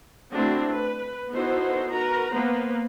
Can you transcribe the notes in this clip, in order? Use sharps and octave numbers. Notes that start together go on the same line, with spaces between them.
A3 C4 D4 E4 F#4
B4
B3 D#4 E4 F#4 A4 C5
F#4 A#4 B4 A#5
A#3 B3 B4 C5